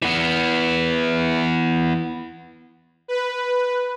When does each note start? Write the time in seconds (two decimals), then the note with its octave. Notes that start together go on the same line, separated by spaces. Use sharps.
0.02 E3 B3
3.08 B4